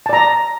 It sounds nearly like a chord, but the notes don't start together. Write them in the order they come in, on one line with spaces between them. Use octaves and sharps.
A5 D5 A#5